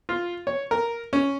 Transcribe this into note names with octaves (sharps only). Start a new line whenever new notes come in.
F4
C#5
A#4
C#4